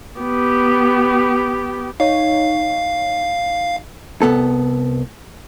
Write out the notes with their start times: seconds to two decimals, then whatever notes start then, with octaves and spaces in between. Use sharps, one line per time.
0.20 B3 G4
2.00 D#4 C#5 F5
4.22 C2 B3 A4